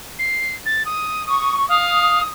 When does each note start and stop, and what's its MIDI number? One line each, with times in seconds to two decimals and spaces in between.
0.18 0.54 96
0.65 0.83 93
0.85 1.25 87
1.26 1.65 85
1.26 1.53 87
1.68 2.20 77
1.68 2.29 87